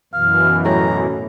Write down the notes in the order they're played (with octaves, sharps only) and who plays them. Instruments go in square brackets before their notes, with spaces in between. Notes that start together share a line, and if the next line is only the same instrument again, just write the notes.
[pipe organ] F#2 B2 E3 [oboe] F5
[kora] A2 A3 [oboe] A#5